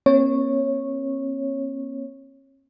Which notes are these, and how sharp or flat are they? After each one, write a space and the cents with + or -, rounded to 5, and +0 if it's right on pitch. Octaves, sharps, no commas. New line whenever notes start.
A#3 +40 C#4 -45 C#5 -10